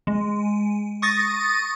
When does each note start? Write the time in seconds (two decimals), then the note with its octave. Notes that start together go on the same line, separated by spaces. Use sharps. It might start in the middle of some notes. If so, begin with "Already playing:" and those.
0.07 G#3
1.02 C#6 D#6 A6 A#6